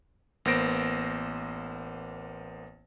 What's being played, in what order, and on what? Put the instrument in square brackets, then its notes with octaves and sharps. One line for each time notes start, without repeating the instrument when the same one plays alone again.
[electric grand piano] A1 A#3 B3 C5 A#6 D7